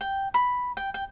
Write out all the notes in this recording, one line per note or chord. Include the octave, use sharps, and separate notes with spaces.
G5
B5
G5
G5